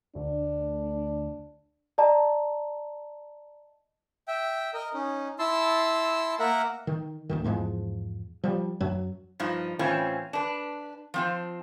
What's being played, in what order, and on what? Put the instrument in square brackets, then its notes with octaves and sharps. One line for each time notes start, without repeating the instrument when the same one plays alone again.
[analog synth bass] D2 [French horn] D4
[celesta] D5 D#5 A5 A#5
[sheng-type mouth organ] E5 G5
A#4 D#5
C#4 D#4
E4 A5 C6 E6
A#3 A#4 E5 F#5
[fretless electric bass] D#3
A1 D2 D#3
E2 G#2 F3 G#3
F3 G3
F#2 F#3
[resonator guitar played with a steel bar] G2 F3 D#4
A2 E3 C4 C#4 F4
D4 B4
F3 C4 F4